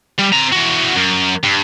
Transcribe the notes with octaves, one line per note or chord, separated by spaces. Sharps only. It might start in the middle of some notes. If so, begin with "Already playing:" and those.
G3
C4 A#5
E3 F#4
F#2
G2